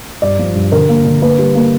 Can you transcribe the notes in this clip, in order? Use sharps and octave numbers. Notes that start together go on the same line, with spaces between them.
G2 D5
F3
G2
D3 A#4
A#3
D3
A#3 B4
G3
A#3